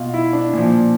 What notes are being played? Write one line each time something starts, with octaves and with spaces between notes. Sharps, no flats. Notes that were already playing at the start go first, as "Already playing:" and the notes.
Already playing: B2 F4
E4
D4
A#2 F3